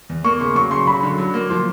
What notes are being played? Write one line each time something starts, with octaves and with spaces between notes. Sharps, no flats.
E2
A#3 C#6
C#3 C6
F#3 C#6
C#3 C6
F#3 B5
D3
F#3
A#3
F3 C6